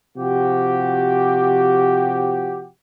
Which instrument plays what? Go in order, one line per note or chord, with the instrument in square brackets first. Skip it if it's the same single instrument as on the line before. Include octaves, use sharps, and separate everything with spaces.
[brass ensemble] C3 F3 F#4 G4